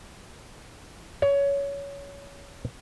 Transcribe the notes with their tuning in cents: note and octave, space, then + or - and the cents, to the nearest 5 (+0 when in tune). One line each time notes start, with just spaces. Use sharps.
C#5 +20